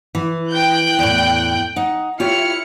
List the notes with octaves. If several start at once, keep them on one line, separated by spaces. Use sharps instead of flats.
E3
G5 F#6 G6
E2 A2
D#4 F#5
E4 F4 G4 C#5 F6 C#7